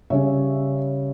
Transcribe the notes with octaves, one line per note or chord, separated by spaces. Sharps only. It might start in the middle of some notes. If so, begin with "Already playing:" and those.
C#3 G3 C#4 C#5 E5